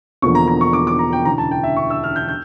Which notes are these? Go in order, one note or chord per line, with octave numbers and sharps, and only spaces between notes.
E1 E2 D3 F3 A#3 C#6
A#5
A#5
C#6
D6
D6
A#5
G5
E1 D2 C#3 E3 A#5
A5
G5
E5
C#6
E6
F6
G6
G6